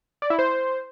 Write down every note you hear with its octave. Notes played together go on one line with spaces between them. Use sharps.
D5
E4
C5